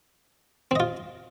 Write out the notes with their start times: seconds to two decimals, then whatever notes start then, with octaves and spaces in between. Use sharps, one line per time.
0.71 C4
0.75 D#5
0.80 F4